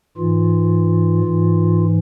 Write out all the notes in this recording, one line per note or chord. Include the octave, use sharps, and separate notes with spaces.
G#2 E3 F4
G#2 E3